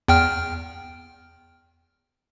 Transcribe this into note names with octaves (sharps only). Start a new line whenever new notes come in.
E2 G5 F6